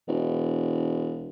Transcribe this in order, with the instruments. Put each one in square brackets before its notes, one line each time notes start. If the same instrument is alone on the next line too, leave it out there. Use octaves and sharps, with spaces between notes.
[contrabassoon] E1